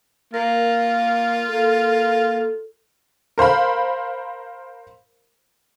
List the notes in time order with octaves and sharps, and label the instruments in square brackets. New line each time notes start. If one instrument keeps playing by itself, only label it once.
[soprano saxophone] A#3 [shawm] F4 [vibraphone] A#4
[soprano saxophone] A#3 [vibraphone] A4
[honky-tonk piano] A#4 C5 F5 B5